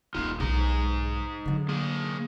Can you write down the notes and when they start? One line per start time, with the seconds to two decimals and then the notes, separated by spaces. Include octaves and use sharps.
0.15 D#1 A#3 D#4 F4
0.40 B1 B2 D#4 G#4 A#5
1.45 D3 F#3
1.69 A#3 G#4